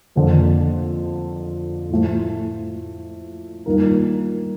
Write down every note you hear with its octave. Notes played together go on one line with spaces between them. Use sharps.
F2 D3 F3 A#3
A2 F3 A3
G2 D#3 A#3 F4 A#4